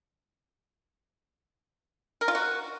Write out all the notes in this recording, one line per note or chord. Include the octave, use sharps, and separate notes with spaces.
A#4
F4
F#4